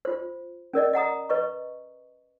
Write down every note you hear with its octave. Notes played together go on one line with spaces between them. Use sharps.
F4 C5
C#4 A#4 D5 D#5
D#5 F#5 A#5 D#6
B4 D#5 C#6